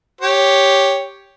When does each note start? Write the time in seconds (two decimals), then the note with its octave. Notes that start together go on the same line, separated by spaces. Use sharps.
0.21 G4 C#5